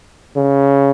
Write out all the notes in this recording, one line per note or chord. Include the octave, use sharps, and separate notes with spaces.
C#3